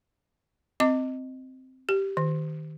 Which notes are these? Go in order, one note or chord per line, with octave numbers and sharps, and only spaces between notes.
C4 D#5 D6
G4
D#3